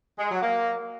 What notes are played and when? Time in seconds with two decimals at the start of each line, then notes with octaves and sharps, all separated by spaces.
0.18 G#3
0.30 F#3
0.42 A#3